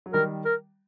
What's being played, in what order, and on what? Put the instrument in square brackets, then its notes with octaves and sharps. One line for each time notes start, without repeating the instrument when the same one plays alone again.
[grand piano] F#3
[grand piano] D#3 G3 [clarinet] A#4
[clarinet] A#4